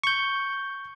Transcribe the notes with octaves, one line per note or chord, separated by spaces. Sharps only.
C#6 G6